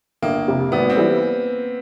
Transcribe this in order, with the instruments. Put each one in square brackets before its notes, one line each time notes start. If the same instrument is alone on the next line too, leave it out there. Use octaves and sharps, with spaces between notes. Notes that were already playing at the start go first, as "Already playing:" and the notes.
[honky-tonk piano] G1 [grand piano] A#3
[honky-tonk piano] F2 C3
[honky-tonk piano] G#1 [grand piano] B3
[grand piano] C4
[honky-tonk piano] E3 G3